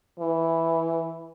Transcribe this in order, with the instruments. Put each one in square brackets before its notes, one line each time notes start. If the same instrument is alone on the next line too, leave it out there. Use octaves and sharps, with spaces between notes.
[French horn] E3